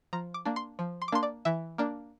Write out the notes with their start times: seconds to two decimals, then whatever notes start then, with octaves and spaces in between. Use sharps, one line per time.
0.13 F3 A#5
0.34 D6
0.45 A#3 D4
0.56 C6
0.79 F3
1.02 C6
1.08 D6
1.12 A#3 D4 C6
1.23 D5
1.45 E3 E5
1.78 A#3 D4